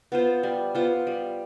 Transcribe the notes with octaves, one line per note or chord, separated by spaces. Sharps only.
B3 F4 C5
G3
B3 F4 C5
G3